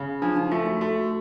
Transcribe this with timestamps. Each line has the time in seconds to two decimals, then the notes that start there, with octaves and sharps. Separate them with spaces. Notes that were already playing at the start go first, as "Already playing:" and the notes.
Already playing: C#3
0.22 F3 D4
0.37 D#4
0.51 A3 F4
0.66 F#4
0.81 A3 F#4